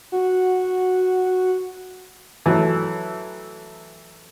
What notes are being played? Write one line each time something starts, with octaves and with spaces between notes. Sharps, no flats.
F#4
E3 F#3 A3